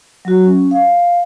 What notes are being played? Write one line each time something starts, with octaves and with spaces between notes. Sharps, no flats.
F#3 F#4
C#4
F5